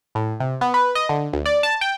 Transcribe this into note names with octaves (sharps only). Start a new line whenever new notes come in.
A2
C3
B3
B4
D#5
D3
D2
D5
A5
G5